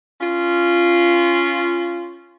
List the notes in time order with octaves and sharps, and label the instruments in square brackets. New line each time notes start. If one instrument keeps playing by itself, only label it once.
[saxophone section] C#4 F4